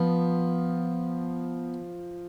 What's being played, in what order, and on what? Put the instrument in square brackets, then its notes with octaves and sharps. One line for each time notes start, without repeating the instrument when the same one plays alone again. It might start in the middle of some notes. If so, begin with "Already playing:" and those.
Already playing: [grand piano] F3 [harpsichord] B3